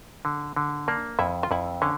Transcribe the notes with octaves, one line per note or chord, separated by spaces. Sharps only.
D3
D3
A#3 D4
F2 E4
F4
F2 E4
D3 C#4